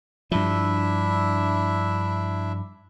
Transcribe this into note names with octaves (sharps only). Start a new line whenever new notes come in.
G2 F3 D4 E4 E5